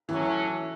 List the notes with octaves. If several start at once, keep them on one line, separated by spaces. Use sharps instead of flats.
E3 F#3 A3 C#4